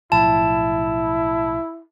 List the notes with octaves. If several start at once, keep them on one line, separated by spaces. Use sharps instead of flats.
B1 A2 F3 E4 A5